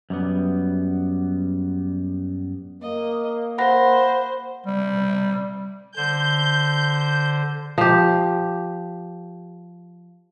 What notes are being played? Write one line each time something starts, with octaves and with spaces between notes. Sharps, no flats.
F#2 G3 B3
A#3 D#5
C5 F#5 B5 A#6
G3
D3 C5 G6
F3 G4